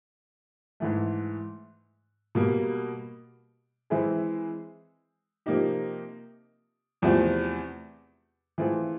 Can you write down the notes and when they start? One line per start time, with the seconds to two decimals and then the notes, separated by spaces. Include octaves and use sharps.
0.80 G#2 E3 A3
2.35 B2 G3 A#3
3.90 E3 G#3 C4 E4 G#4
5.46 C3 F3 A#3 D#4 G4
7.02 E2 C3 F3 A3 C4
8.58 E3 A3 C4 F4 G#4